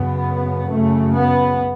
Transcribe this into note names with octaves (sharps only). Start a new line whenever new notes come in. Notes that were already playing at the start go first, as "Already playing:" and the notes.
Already playing: F#2 C#3 B3
F#2 C#3 A3
B3